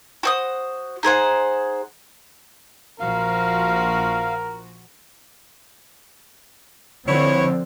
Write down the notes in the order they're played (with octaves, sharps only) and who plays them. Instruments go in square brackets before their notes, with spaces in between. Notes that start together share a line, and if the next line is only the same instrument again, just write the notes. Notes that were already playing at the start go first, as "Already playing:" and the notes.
[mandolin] F#4 C5 D#6
D#4 G#4 C5 F#5
[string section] A#1 F3 F#4 [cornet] A#4 [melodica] F5
[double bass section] D3 F3 C4 [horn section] E4 B4 C#5